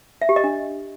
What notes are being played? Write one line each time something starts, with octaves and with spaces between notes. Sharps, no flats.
E5
G4
D#5
D4